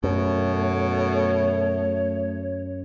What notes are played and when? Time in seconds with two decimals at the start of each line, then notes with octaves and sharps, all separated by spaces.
0.03 F#2 B2 A3 C#5